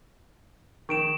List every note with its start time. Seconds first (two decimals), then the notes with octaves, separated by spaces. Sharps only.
0.89 D#3 C#6 D7 E7